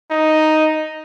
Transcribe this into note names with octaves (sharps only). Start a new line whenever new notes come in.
D#4